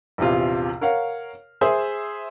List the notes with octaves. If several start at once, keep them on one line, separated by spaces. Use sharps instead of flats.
A#1 E2 C3 F4
A#4 C#5 F5 F#5
G#4 C5 E5 G#5